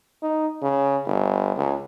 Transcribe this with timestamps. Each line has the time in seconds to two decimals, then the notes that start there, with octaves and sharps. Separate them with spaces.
0.22 D#4
0.63 C#3
1.06 G1
1.56 C#2